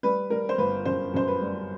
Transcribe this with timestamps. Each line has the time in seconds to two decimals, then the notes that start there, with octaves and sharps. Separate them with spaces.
0.03 G3 B4
0.30 G3 A#4
0.49 C5
0.58 G1 B4
0.85 F#2 C5
1.14 F#2 C5
1.28 B4
1.41 G3